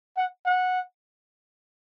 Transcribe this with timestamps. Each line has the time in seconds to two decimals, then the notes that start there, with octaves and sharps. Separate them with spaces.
0.17 F#5
0.46 F#5